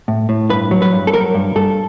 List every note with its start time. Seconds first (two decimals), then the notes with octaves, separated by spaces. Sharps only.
0.08 A2
0.29 A2
0.50 G2 B4
0.71 F#3
0.82 B4
0.93 G2
1.07 A4
1.14 F#3 A#4
1.34 G2
1.56 G2 A4